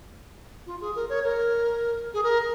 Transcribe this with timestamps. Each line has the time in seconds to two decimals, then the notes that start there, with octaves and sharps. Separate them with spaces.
0.66 F4
0.81 G#4
0.95 A#4
1.09 C#5
1.24 A#4
2.14 G#4
2.23 A#4